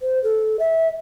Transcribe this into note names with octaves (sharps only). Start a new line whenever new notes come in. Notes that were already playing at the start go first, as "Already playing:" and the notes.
C5
A4
E5